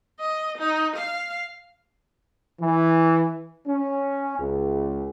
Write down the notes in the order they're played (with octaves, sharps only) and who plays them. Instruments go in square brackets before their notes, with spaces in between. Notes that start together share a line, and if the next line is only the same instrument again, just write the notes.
[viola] D#5
D#4
F5
[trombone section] E3
C#4
C#2